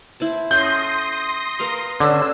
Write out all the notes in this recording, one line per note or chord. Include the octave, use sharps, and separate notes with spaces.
E4 C5 A5
C#4 A4 F#5 C6 D#6 G6 A#6
A#4 B4 F5
D3 C#4 E6